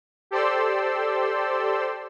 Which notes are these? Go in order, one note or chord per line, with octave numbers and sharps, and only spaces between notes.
G4 A4 C5 D5 C6 E6